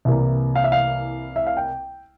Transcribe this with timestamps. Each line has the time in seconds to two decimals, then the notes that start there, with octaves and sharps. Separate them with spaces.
0.05 C2 C3 E3 A#3
0.56 F5
0.64 E5
0.72 F5
1.36 E5
1.47 F5
1.57 G5